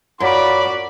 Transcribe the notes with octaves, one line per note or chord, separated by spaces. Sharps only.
F#2 F4 F#4 D5 B5